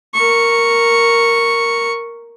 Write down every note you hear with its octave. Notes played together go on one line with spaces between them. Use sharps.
A#4 C#6